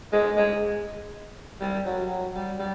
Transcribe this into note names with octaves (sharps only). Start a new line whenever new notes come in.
G#3
G#3
G3
F#3
F#3
G3
G3